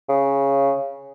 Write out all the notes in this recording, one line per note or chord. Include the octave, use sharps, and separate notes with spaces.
C#3